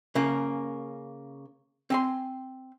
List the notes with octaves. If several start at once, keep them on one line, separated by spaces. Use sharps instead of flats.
C#3 A#3
C4 G#5 C6